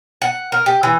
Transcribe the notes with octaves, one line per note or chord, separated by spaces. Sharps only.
F#5
A#4
G4
E3